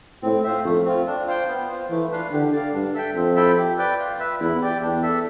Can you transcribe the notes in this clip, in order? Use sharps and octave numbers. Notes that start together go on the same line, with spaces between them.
A2 C4
F4 C5 E5
F2 A3
C4 F4
D4
F4 C5 G5
B3
F4 C5
E3 A3
D4 F4 B4 F5
D3 G4
D5 F5
G2 D4
A4 E5 G5
F2 C4
E4 A4 E5 G5
G4
B4 D5 G5
F4
B4 E5
E2 E4
G4 D5 G5
E2 D4
A4 E5